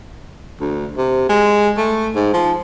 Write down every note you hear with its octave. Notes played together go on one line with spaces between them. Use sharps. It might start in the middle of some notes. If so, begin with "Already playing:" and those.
D2
C3
G#3
A3
G#2
F3